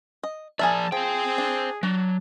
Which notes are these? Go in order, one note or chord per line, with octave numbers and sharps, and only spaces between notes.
D#5
F3 G#4 A#4 D5 E5 A5
F3 G#4 C5 G5
D4
F#3 D4